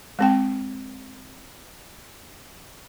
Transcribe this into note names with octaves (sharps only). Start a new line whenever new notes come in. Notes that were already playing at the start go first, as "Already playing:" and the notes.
G#3 C4 G5